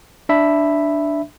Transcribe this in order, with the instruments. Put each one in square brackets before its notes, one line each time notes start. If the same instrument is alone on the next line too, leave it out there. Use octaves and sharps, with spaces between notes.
[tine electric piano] D4 E5 B5